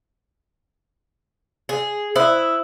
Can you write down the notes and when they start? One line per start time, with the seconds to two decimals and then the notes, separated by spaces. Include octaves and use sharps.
1.69 G#4
2.16 E4 C5 D#6 F#6